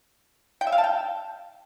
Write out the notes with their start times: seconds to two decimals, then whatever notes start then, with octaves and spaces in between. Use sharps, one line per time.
0.61 G5
0.67 E5
0.72 F5
0.78 A5
0.84 G5